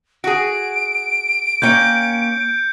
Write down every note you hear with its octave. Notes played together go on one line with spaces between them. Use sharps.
F#4 G#4 D7
A#3 C#4 G5 G6 C#7